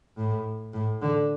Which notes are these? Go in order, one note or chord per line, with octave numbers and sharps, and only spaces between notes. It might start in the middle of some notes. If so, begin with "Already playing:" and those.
A2
A2
D3